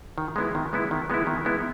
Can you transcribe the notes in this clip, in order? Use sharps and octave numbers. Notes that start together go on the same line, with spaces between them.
D#3
G#3 B3 E4
D#3
G#3 B3 E4
D#3
G#3 B3 E4
D#3
G#3 B3 E4